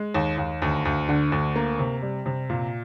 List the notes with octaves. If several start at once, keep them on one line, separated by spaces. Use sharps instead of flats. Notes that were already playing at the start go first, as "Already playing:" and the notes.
Already playing: G#3
D#2
D#2
D2
D2
D3
D2
A#3
C3
G3
C3
A#2